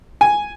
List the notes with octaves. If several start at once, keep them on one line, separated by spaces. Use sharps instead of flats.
G#5